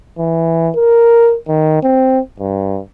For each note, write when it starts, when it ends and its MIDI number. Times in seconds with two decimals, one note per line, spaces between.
0.19 0.70 52
0.76 1.36 70
1.48 1.80 51
1.83 2.19 60
2.40 2.79 43